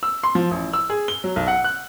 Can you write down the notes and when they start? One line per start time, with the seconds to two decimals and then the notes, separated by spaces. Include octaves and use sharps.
0.03 E6
0.23 C6
0.35 F3
0.51 A1
0.73 E6
0.90 G#4
1.08 G7
1.24 F#3
1.36 B1
1.48 F#5
1.64 F#6